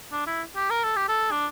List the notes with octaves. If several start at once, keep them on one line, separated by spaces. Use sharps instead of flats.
D4
E4
G4
A#4
A4
G4
A4
D4